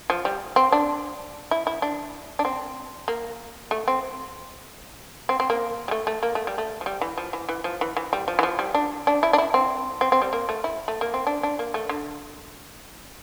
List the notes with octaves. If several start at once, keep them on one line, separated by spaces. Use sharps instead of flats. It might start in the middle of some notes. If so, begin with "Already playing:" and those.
F3
G3
C4
D4
E4
E4
D4
D4
C4
A#3
A3
C4
C4
C4
A#3
G3
A3
A3
A#3
A3
G3
A3
F3
G3
E3
F3
E3
E3
F3
E3
E3
G3
F3
E3
F3
G3
D4
D4
E4
D4
E4
C4
C4
C4
G3
A#3
A3
E4
A3
A#3
C4
D4
D4
A#3
A3
D3